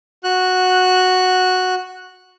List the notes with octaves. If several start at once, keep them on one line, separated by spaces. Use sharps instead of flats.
F#4 F#6